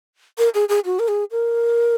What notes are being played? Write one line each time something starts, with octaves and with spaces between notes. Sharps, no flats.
A#4
G#4
G#4
F#4
A#4
G#4
A#4